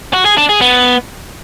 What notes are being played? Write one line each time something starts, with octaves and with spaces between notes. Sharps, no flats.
F#4
G#4
D4
G#4
B3